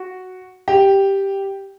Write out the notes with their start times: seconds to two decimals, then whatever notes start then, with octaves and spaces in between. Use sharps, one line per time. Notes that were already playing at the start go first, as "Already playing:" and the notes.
Already playing: F#4
0.68 G4